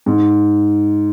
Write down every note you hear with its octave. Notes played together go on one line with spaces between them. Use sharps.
G#2